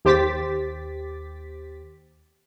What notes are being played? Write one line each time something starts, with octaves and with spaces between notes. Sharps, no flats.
D#2 G4 C5 D6 A6 B6